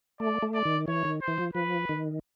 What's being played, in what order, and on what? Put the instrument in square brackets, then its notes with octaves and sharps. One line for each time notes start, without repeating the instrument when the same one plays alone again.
[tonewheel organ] A3 [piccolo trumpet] D5
[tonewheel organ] A3
[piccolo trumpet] D5
[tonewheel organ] D#3
[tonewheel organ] E3 [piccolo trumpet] C#5
[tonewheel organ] D#3
[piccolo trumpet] C5
[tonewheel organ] E3
F3
[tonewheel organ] F3 [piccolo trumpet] B4
[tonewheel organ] D#3